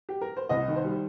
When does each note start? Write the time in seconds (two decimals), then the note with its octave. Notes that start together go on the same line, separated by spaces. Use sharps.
0.09 G4
0.21 A#4
0.37 C5
0.49 C2 D#5
0.68 D#3
0.76 C5
0.84 G3